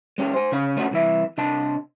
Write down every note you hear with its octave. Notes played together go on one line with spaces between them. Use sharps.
G#3 C#4 G4
C5 G#5
C#3 C#4 F5
A3 C#4 D4 F4 F#4 A4
C2 E3 E5
C3 D4 D#5 A5